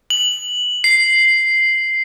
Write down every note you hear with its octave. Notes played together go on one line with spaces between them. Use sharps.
F#7
C7